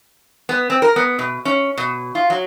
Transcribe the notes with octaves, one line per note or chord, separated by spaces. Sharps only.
B3
C4
A#4
B3
B2
C#4
B2
F4
F#3